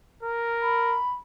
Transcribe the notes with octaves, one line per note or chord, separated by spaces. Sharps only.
A#4
B5